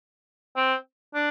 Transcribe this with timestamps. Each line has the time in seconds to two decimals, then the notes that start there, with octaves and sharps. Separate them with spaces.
0.56 C4
1.15 D4